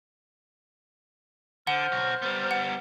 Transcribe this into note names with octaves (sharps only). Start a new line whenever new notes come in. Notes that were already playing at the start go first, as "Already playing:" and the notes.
D3 C5 F#5 F6 G6
B1 F#4
G3 B3
F#5